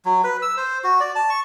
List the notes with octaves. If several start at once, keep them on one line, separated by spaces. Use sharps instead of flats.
F#3
B4
E6
C5
F#4
D5
A5
C#6